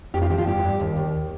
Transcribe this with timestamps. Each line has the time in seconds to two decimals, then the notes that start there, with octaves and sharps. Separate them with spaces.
0.14 F2 G4
0.22 F4
0.30 F3 G4
0.38 F4
0.47 G2 G4
0.64 G2
0.80 D#2
0.97 D#2